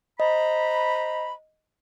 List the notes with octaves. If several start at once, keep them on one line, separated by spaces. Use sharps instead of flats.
C5 D#5 A#5 B5